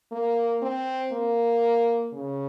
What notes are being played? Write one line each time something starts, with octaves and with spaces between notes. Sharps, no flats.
A#3
C4
A#3
C#3